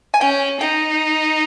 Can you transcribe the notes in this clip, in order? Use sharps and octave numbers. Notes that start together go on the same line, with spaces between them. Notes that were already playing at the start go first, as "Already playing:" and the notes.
G#5
C#4 G5
D#4 G5